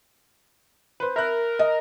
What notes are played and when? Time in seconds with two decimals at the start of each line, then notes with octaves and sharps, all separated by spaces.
1.00 B4 C5
1.16 A#4 E5 B5 F#6
1.59 D#5